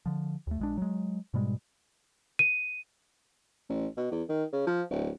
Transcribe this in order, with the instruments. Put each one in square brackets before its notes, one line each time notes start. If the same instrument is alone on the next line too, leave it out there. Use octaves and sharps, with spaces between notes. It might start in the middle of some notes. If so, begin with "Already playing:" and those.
[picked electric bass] D3 F3
D#2 A3
A#1 G#3 D4
F#3 G#3
G#2 B2 G3 G#3
[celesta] D#7
[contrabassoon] A1
B2
E2
D#3
C#3
F3
D1